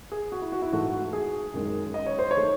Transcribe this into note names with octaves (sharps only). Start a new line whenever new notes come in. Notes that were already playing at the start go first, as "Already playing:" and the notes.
G#4
F#4
E4
F#4
E4
G#2 E3 A3 F#4
G#4
F#2 D#3 G#3
D#5
C#5
C5
C#5
D#3 A3